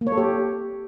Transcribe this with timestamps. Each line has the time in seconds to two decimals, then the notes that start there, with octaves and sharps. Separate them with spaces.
0.01 A#3
0.07 C#5
0.12 A4
0.18 G4